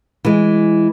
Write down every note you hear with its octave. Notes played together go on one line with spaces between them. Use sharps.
E3 G#3